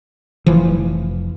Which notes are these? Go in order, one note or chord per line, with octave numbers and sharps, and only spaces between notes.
F1 E3 F3